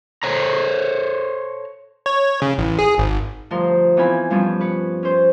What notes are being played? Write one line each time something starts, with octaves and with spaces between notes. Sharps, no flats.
A4 C5 C#5 A#5
C#5
C#3
A1
G#4
G#1
D2 G2 F3 A#4 C5 C6
E3 B3 C4 F5 G#5 B5
G2 F3 G3 B3 C#4
B4 C#5
C#4 C5